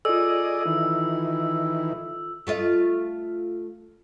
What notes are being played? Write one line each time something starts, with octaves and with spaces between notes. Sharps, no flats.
F4 G#4 A4 D5 D#5 E6
D#3 E3
A3 F4 D#5